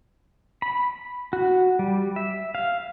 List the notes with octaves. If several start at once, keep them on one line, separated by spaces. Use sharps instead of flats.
B5
F#4
G3
E5
F5